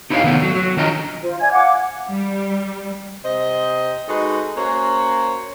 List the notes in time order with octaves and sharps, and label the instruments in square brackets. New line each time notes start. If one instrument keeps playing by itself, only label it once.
[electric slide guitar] D#4 E4 G4 C#5 D#5 F5
C3 D#3 A3 B3 E4 A4
F#3
F#3
D#3 D4 F4 D#5 A#5
[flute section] F4 C5
D5 E5 G#5 G#6
F5 F#5 D6
F#5
[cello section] G3
[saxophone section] C3 C5 D#5
G#3 D#4 F#4 A4 B4
A#3 C#4 F#4 C5 C#5